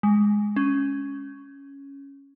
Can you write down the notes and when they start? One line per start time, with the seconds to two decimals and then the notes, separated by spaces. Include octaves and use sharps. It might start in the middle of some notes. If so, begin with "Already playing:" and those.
0.03 G#3
0.56 C#4